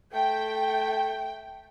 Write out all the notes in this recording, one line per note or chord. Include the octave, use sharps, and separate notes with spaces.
A3 G5